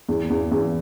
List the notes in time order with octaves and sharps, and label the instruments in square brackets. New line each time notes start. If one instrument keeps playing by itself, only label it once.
[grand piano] E2
E2
E2